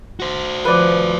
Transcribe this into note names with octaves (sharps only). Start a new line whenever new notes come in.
F#4 C5
F3 B4 D5